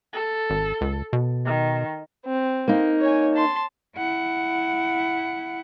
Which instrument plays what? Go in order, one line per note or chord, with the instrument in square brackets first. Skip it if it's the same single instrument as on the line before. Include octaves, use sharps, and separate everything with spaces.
[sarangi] A4
[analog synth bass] G#1
C#2
B2
[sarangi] D#3
[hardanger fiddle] C4
[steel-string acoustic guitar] A#3 D#4
[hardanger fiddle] C#5 G#5
A5 C6
[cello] E4 F#5